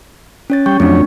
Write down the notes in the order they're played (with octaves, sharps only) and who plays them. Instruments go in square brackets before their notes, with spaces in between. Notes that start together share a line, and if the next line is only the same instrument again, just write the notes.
[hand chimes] C#4 C#5 A6
[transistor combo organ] G3 G5 [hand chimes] C#6
[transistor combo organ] F2 F#3 C#5 [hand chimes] A3 C4 D4